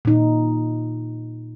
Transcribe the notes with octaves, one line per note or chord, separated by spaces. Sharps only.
A#2 D#4